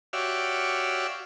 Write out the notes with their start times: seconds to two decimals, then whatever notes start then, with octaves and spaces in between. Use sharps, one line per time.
0.13 F#4 G4 C#5 D5 E5 F5